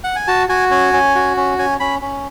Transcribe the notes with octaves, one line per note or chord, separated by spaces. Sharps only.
F#5
G#5
F#4 A5
F#4 G#5
C#4 G#5
C#4
F#4
C#4
C#4 G#5
C#4 B5
C#4